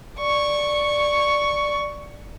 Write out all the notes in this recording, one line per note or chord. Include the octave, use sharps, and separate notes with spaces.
D5 C#6